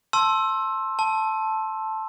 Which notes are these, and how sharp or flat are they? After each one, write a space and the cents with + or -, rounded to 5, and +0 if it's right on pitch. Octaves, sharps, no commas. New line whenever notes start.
A5 +0 C6 +20 E6 +5
A5 -5 E6 +0